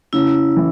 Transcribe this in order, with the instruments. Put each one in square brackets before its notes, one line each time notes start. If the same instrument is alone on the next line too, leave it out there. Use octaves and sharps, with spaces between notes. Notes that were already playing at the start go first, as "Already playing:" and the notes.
[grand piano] C#3 [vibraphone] E4
[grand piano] E3